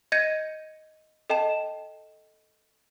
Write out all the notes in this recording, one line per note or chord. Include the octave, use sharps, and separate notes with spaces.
D#5 G6 G#6 A#6 C#7 D#7
A4 D#5 G5 A5 E7